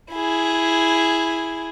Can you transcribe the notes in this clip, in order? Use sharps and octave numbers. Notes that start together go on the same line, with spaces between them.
E4 G#4